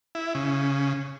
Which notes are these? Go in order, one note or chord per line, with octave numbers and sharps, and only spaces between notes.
E4
C#3